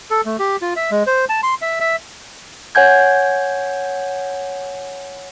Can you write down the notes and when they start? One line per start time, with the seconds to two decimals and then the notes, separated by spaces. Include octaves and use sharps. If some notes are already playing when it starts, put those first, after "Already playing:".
0.11 A4
0.25 A3
0.39 G4
0.62 F4
0.76 E5
0.91 G#3
1.07 C5
1.29 A5
1.43 C6
1.62 E5
1.80 E5
2.75 C#5 F#5 G#5 G6 G#6